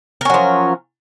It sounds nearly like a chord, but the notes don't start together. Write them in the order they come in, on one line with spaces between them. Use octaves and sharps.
A#4 C#4 F#3 F3